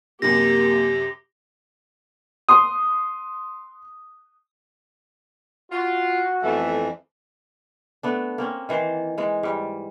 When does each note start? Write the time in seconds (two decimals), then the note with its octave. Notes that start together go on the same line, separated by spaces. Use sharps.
0.22 F#2 C3 A#3 G4 A#6
2.49 C6 D#6
5.71 F4 F#4
6.43 F2 E3 A3 B3 E5
8.03 A3 B3 D4
8.38 A#3 C4 C#4
8.69 D#3 E3 C5
9.18 E3 G#3
9.43 G#2 G3